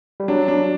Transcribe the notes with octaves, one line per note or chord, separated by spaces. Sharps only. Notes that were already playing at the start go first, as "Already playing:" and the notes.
G3
F#3 D4
D4